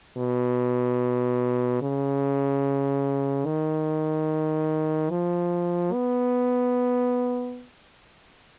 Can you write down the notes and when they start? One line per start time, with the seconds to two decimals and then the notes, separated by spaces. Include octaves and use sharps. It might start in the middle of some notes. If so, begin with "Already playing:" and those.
0.17 B2
1.82 C#3
3.46 D#3
5.10 F3
5.93 B3